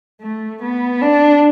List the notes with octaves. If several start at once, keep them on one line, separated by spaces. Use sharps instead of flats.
A3
B3
D4